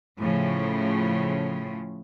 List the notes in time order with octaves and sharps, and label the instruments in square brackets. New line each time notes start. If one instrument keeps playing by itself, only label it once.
[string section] A2 C#3 F3